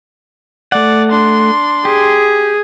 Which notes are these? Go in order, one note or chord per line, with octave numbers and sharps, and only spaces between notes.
A3 D5 F#5
D4 C6
G4 G#4